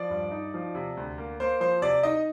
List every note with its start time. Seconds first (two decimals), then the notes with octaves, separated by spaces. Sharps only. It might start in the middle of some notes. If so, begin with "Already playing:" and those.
Already playing: F3 D5
0.10 G2
0.31 D#4
0.54 F3
0.75 C3
0.97 D2
1.18 A#3
1.40 A#3 C5
1.60 F3 C5
1.82 C3 D5
2.03 D#4 D#5